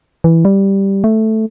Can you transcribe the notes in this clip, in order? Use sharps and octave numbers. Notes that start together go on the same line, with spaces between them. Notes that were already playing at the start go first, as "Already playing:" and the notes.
E3
G3
A3